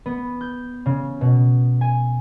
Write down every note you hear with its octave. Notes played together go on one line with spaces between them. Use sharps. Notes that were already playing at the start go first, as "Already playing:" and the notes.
B3
G6
C#3
B2
G#5